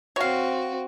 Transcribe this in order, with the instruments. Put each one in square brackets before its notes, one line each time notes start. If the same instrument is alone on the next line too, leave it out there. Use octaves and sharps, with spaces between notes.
[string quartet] C4 F#4 [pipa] C#5 F5